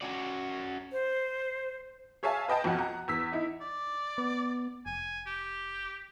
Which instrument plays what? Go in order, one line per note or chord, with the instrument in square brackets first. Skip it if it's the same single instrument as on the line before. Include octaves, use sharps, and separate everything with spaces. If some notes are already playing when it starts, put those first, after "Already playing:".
[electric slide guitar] C#4 F#4 D5
[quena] C5
[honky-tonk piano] G#4 C#5 E5 F5 G#5 A5
B4 D#5 G5 A5
B1 F2 F#3 F#5
F#5 A#5
E2 E6 B6
D#4 E4
[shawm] D5
[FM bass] B3
[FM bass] F1 [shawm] G#5
[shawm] G4